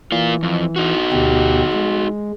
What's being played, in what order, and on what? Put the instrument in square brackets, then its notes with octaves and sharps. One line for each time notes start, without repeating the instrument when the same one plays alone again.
[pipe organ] E3 [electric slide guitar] A#3 F4
[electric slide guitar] F2
D#4 F#4
[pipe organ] D2 B2 G4
G#3